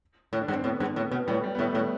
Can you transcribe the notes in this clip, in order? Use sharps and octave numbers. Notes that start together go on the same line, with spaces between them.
A2
D4
G2
C4
A2 B3
G2
A2
B2
A2 G3
G3
B3
A2 A3
A2